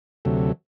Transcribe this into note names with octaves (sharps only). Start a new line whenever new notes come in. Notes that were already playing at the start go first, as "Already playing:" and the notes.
D2 C3 F#3 A3